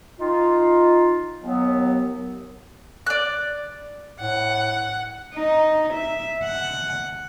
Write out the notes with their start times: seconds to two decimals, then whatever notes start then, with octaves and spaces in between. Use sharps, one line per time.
0.20 D#4 F4
1.43 D#2 F#3 B3
3.06 D5 F#6
4.20 A2 F#5
5.34 D#4
5.94 E5
6.44 F#5